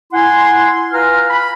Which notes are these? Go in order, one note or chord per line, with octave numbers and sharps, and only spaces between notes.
E4 F#5 G#5 C6
F4 B4 F5 G#5 A#5 F6
B5